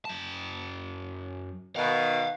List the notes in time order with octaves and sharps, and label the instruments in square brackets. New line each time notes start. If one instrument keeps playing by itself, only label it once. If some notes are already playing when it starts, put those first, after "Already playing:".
[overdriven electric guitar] F#2 A5
[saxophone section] B2 D#3 [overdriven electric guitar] F5 F#5